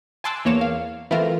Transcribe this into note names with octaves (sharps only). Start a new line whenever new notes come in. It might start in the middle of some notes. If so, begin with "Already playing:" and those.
G#5 A5 C6 D6 E6 F#6
E2 A#3 C#5 D6 E7
F5
E3 A3 C4 F4 A#4